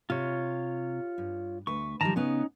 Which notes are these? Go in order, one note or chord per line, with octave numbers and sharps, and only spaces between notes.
C3 F4 C#5
G2
D2 B4 C#6
D#3 F3 G3 A5 A#5
C#3 B3 C#4 D#4